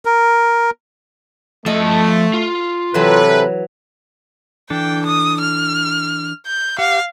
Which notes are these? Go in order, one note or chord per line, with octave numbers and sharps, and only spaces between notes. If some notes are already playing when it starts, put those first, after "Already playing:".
A#4
F3 A3 A4 D#5
F4
C3 E3 F#3 A4 B4
E3 D4 A4 G5
D#6
F6
G6
G4 F5 F#5